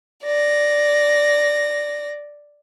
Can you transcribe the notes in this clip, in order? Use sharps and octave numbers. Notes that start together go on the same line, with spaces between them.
D5 A#6